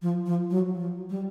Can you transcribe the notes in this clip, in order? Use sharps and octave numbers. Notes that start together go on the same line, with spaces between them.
F3
F3
F#3
F3
G3